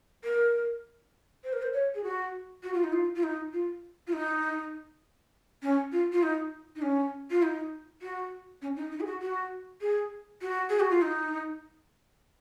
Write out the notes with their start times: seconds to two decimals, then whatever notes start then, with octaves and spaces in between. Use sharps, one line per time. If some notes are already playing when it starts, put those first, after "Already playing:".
0.24 A#4
1.44 C5
1.53 A#4
1.62 C5
1.73 C#5
1.95 G#4
2.04 F#4
2.63 F#4
2.74 F4
2.84 D#4
2.93 F4
3.16 F4
3.23 D#4
3.53 F4
4.07 F4
4.13 D#4
5.63 C#4
5.92 F4
6.12 F4
6.23 D#4
6.76 D#4
6.82 C#4
7.31 F4
7.43 D#4
8.02 F#4
8.62 C#4
8.77 D#4
8.92 D#4
9.00 G#4
9.07 F#4
9.22 F#4
9.81 G#4
10.42 F#4
10.70 G#4
10.80 F#4
10.90 F4
11.02 D#4